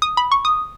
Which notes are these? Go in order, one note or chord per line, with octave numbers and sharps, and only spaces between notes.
D#6
B5
C#6
D#6